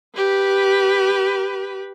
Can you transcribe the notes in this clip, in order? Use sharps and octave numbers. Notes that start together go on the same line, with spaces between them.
G4 B4